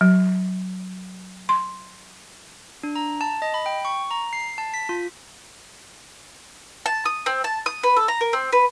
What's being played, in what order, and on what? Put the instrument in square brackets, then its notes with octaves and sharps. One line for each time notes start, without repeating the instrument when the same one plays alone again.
[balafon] F#3
C6
[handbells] D4
A#5
A5
D#5
B5
G5
C#6
A#5
C7
A5
B6
F4
[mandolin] A5
D#6
C4
A5
D#6
B4
A4
A#5
A#4
C4
B4